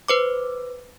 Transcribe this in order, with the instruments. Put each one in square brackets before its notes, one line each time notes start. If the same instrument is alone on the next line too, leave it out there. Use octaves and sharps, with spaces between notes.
[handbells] B4 C5 D6